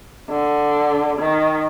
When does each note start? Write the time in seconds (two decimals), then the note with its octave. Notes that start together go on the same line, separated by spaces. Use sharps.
0.30 D3
1.18 D#3